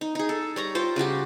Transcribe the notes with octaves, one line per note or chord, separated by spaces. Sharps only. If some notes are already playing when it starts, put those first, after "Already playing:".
D#4
D#4 G#4
A4
G3 C#5 A#5
F4 C5 G5
C#3 G3 F#4 G4